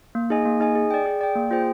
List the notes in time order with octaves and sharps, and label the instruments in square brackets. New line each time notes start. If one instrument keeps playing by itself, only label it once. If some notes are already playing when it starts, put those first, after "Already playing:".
[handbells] A#3
D#4 G#4 D#5 G#5
A#3
D#4 G#4 D#5 G#5
G#4
D5 G5
G#4
D5 G5
A#3
F4 G#4 C5 G5